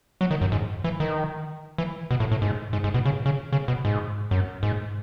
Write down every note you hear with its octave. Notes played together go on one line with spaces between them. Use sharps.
F#3
D#3
F#2
G#2
E3
D#3
E3
B2
A2
A2
G#2
G#2
G#2
B2
C#3
C#3
C#3
B2
G#2
F#2
G#2